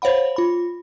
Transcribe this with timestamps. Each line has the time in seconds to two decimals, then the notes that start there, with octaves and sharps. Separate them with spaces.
0.02 C5 C#5 F5 F#5 B5
0.36 F4 B5